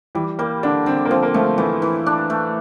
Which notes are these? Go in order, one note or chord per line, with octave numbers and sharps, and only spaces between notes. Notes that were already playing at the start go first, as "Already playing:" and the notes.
E3 G3
G3 A#3
D3 D4
D3 C4
A#3
F3 C4
A#3
F3 A3
E3 A3
E3
D4
A3